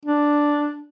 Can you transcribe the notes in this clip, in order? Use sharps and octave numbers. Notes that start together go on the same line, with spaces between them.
D4